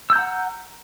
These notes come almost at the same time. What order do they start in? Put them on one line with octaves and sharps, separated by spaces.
E6 G6 A#5 F#5